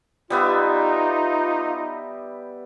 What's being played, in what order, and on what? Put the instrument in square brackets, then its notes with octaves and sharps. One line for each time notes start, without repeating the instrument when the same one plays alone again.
[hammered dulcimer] G3 B3 E5 [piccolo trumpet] D#4 [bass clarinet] F4